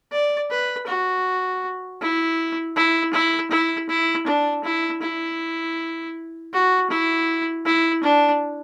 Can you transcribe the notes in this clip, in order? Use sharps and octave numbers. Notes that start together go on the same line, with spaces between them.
D5
B4
F#4
E4
E4
E4
E4
E4
D4
E4
E4
F#4
E4
E4
D4